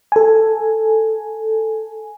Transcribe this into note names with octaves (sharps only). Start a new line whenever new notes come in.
A4 G#5